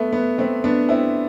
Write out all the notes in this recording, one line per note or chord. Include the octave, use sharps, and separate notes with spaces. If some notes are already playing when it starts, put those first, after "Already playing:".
Already playing: A3 B3
B3
A3 C4
B3 D4
C4 E4